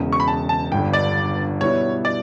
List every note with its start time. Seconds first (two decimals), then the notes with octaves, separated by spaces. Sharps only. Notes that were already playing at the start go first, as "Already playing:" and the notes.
Already playing: E1 E2 C#3
0.13 C#6
0.20 B5
0.28 A5
0.49 A5
0.71 G1 G2 D3 G5
0.93 D5
1.61 B2 G3 B3 E4 C#5
2.05 D5